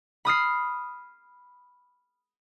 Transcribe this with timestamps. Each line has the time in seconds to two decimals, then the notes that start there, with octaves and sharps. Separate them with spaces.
0.25 B5 D#6 F6 C7